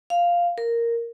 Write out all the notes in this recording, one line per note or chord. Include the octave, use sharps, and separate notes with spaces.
F5
A#4